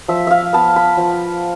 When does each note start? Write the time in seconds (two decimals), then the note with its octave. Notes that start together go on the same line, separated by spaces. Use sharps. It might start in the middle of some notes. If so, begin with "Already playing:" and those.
0.08 F3 E5
0.27 E5 F5
0.53 B3 A5
0.76 B5
0.97 F3